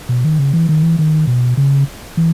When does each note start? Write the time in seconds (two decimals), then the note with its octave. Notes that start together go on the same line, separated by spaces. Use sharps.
0.09 B2
0.24 D#3
0.39 C#3
0.53 E3
0.69 D#3
0.83 E3
0.99 D#3
1.27 B2
1.57 C#3
2.17 E3